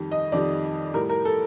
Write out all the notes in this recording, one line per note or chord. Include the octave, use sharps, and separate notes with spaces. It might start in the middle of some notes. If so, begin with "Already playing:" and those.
Already playing: F2 D#3 G3
D#5
F2 D#3 G3 D5
A2 G3 A#4
A#4
A4